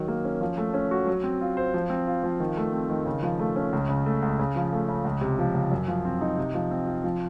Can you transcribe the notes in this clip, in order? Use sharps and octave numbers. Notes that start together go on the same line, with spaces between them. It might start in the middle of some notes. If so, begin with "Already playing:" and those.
Already playing: D#3 F#3
A#3
C#4
F3
A3
C#4
F#4
F#3
C4
F4
C5
F3
C4
F4
F3
D#3
A3
C4
D#3
C#3
F3
A3
C#4
C#2
C#3
A3
C#2
C#3
F3
A3
C#3
C#2
C3
F3
C#2
F#2
F3
C4
D#4
C3
F3
C4
F4
F3